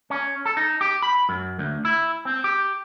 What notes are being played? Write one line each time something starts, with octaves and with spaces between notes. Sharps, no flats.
C#4
A4
D#4
G4
B5
F#2
D2
E4
C4
G4